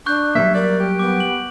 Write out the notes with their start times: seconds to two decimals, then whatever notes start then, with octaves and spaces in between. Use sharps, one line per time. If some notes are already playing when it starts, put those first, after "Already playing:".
0.06 D4 C#6 F#6 G6
0.35 F#3 G3 A#3 E5
0.54 A#4 D5
0.80 G4
0.99 B3 D6
1.20 F#7